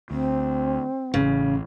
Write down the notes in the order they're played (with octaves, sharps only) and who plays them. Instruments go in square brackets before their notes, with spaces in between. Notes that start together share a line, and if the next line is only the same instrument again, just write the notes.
[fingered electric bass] D2 [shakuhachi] C4
[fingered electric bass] A1 [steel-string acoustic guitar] C#3